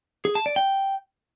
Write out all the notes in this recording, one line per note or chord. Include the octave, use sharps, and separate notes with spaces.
G#4
A5
D5
G5